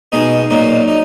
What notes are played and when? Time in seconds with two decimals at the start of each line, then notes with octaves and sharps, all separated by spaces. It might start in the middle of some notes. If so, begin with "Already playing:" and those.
0.12 B2 G#3 D#4 G#4
0.50 A#2 F#3 A#3 D#4
0.88 D#4